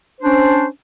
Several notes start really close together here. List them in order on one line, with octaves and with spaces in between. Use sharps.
C5 D4 C#4